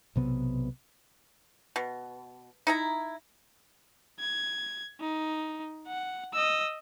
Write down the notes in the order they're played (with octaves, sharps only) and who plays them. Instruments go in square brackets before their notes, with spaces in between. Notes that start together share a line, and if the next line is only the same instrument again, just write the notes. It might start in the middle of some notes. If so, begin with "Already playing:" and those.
[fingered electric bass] B1 C3 B3
[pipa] B2
D#4 E4 A#5
[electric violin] G#6
D#4
F#5
D#5 E6